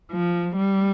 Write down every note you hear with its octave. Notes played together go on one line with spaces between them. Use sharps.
F3
G3